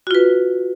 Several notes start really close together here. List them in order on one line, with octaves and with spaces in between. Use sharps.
F#4 F4 B4